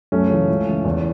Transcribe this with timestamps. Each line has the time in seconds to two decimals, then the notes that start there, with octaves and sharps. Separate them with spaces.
0.12 F#2 A3 C#4
0.30 C#3 E3
0.49 C#2
0.67 C#3 E3
0.85 E2